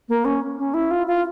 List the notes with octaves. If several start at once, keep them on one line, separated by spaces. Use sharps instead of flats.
A#3
C#4
C#4
E4
F4
F4